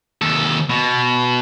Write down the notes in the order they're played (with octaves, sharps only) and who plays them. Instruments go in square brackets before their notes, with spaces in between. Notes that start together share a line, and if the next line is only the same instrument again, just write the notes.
[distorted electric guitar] D#2 A4
B2